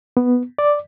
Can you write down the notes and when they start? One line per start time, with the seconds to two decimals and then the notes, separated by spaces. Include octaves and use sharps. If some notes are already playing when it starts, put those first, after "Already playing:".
0.17 B3
0.59 D5